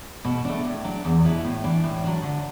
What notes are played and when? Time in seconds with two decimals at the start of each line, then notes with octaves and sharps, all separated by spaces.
0.25 B2
0.45 A3 D4
0.65 A2
0.84 F#3 D4
1.05 E2
1.24 B2 B3 E4
1.44 A2
1.64 E3 D4
1.84 A2
2.04 F#3 D4
2.23 D3